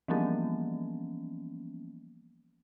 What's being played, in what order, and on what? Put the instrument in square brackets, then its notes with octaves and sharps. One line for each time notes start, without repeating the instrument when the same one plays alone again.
[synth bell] E3 F3 G3 A#3 B3 C#4